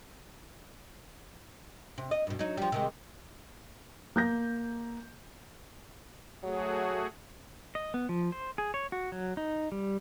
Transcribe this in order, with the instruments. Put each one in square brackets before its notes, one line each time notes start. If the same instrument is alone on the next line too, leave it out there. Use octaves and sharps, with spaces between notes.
[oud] C3
D#5
G2 B2
F#3 D#4
F3 G3
C3 D#3 G#3
[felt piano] A#3 G6 A#6
[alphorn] F#3 [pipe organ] A3 F#4 G#4
[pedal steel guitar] D#5
B3
F3
C5
G#4
C#5
F#4
F#3
D#4
G3